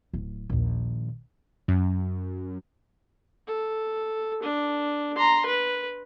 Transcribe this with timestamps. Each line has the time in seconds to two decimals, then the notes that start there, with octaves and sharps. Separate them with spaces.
0.13 D1
0.50 A#1 D#2
1.68 F#2
3.47 A4
4.43 D4
5.16 A#5 C6
5.46 B4